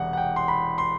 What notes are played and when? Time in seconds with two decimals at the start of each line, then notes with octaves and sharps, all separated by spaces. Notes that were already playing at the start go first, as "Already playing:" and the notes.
Already playing: E1 E2 C3 F#5
0.13 F#5
0.17 G5
0.36 C6
0.48 B5
0.78 C6